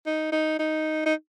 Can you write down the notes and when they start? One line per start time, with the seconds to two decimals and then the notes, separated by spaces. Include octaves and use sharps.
0.06 D#4
0.32 D#4
0.59 D#4
1.06 D#4